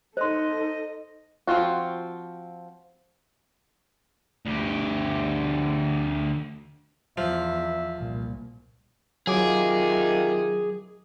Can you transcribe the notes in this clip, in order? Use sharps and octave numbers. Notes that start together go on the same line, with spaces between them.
D#4 A4 C5 D#5 C6
F3 C4 F4 F#4
D2 G4
E2 F3 E5
C2 A#2
C3 D#3 F#3 F4 G#4 D6